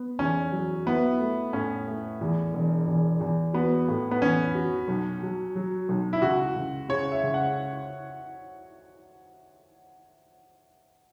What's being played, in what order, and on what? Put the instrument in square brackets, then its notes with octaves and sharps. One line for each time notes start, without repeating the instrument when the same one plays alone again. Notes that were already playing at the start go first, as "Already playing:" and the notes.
Already playing: [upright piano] B3
[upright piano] E2 [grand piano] C#4
[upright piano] F#3
[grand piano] B3 [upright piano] E4
[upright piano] A3
[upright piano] A2 [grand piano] C#4
[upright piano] A3
E2
E1
E2
E2
[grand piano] B3 [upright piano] F#4
[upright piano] A2
[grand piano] B3
[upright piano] A1 [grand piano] C#4
[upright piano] F#4
B1
F#3
F#3
B1
[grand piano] E4
[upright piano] C#2 [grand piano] F#4
[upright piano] C#2
[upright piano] C#3 [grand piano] C#5
[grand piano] E5
[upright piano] C#2
[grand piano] F#5